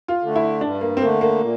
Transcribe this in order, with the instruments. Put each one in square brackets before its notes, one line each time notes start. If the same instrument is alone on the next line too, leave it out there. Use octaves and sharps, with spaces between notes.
[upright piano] F4
[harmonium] D3 A3
[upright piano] E4
[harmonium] G2 [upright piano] D4
[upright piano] A#3
C4
[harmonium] D3 A3 [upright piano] A#3
[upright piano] A#3
[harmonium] A#2